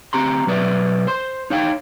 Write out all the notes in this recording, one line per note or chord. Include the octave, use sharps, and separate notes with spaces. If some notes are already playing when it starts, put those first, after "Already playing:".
D2 C4 G4 A#5 C6
B2 F#3 B4 D5 E5
C5 C6
D#4 C#5 F5 G5